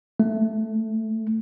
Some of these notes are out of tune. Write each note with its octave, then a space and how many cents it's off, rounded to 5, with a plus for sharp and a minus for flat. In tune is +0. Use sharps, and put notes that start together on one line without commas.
A3 +0